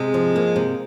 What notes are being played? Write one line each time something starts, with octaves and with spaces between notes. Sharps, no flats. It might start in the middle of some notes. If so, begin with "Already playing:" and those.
Already playing: C3 G#3
F3
A#3
C3